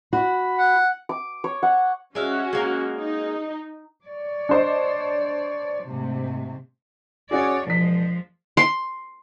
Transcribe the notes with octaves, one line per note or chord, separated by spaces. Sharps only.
F#4 B5
F#5
D6
C#5
F#5
G#3 C#4 F#4 E5 F5
G#3 A#3 A#4
D#4
C#5 D5
D4 C5 D#5
G#2 C3 A3
C#4 F#4 G#4 C#5 D5
E1 F3 G#3 B6
C6